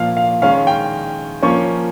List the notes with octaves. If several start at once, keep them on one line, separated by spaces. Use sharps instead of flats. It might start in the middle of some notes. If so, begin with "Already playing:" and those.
Already playing: A#2 F3 A#3 F5
F5
D#3 G#3 C#4 F5
G5
F3 A#3 C#4 C#6